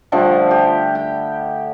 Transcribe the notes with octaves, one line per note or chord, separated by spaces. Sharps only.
D3 F3 G3 A3
G4
G5